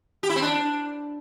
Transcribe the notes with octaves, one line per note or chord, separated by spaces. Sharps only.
G4
E4
C4
D4